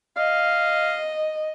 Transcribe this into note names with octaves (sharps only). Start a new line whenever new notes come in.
D#5 F5